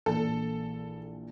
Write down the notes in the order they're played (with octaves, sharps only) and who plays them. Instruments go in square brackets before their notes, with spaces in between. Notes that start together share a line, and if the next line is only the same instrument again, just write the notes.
[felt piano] A#1 A#2 E3 [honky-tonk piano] A4